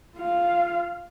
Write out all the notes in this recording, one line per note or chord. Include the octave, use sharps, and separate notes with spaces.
F4 F5